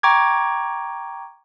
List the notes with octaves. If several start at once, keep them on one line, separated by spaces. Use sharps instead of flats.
G5 A#5 C#6 D6 G#6